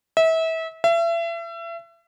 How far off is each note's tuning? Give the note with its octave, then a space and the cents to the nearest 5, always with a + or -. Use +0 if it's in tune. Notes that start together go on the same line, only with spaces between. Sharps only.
E5 -30
E5 +35